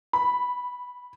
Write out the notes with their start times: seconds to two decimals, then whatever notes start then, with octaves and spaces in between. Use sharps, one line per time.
0.13 B5